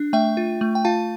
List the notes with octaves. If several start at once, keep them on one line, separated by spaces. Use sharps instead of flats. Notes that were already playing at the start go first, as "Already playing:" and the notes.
Already playing: D4
A3 E5 G5
F4
A3
G5
F4 F5 A5